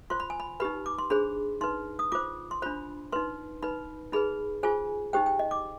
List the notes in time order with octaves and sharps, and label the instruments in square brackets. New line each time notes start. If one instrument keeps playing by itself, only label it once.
[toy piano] F4 C5 C6
B5
G#5
B5
D#4 G4 B4 B5
D6
C6
D4 G#4 C5 B5
D#4 B4 C6
D#6
F4 C5 D6
C6
D4 F4 C5 B5
D#4 B4 C6
D#4 B4 B5
D#4 G#4 B4 B5
F4 G#4 C5 G#5
D#4 G4 C5 G5
G5
D#5
D6